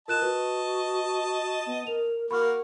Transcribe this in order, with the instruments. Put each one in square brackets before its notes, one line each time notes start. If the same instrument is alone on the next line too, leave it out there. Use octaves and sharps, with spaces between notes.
[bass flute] F4 [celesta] A#4 F#6 E7 [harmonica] D#5 A5
[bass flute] F#4 [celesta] B4
[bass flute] B3
[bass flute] A#4 [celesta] F7
[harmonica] A#3 F#4 [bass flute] A#4 [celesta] B5 C#6 F6